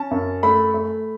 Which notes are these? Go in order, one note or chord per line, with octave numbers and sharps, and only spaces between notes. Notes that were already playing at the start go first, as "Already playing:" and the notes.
Already playing: C#4 A5
F#2
A3 B5
A3